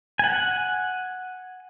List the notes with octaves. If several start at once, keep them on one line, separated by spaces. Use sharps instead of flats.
F#5 G#5